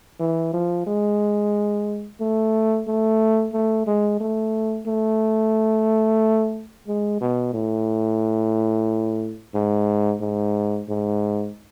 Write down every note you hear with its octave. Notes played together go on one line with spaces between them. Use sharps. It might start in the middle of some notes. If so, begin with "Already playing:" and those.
E3
F3
G#3
A3
A3
A3
G#3
A3
A3
G#3
B2
A2
G#2
G#2
G#2